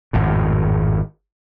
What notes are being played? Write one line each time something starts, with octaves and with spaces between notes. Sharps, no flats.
G#1 F2 A2